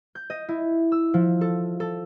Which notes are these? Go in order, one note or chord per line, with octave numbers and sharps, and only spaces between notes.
G6
D#5
E4
E6
F3
A4
A4